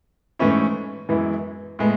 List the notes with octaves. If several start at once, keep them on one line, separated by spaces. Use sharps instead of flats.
G#2 E3 A3 C#4 E4
F#2 E3 G#3 B3 E4
A2 G#3 B3